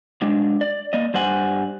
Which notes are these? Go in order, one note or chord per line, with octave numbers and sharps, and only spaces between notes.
F#3 G#3 D4
D5
A#3 D5 D#5
G2 G3 C5 F#5 G#5